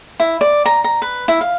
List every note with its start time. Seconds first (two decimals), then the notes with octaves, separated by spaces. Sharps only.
0.20 E4
0.41 D5
0.66 A#5
0.84 A#5
1.02 B4
1.28 E4
1.41 F5